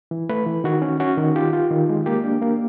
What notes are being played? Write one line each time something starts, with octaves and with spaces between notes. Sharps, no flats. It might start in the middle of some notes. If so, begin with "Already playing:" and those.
E3
A3 B4
E3
D#3 F#4
C#4
C#4 F#4
D#3
F4 G4
F4
D#3
G#3
A#3 G4
D4
A#3